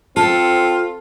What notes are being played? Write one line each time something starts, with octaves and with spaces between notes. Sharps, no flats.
C4 F4 A4